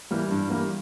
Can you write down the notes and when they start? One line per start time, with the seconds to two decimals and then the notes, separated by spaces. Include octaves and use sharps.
0.11 E3 G3 A#3
0.31 G2
0.50 E3 G3 A#3